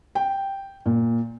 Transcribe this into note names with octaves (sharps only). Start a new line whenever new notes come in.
G5
A#2